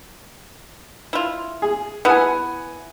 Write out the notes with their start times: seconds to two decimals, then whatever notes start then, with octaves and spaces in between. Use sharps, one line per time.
1.13 E4 F4
1.62 G#4
2.05 B3 E4 F#5 G#5